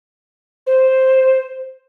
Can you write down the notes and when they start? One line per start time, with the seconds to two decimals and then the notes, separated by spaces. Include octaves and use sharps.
0.67 C5